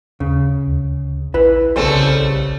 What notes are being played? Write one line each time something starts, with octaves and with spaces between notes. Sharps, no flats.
D#2 C#3
D2
A#1 E4 B4
C2 C#3 G3 A3 C4 G#4 A5 C6